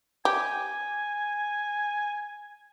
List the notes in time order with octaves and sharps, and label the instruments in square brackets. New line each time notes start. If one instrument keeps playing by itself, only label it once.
[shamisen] G4 [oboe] G#5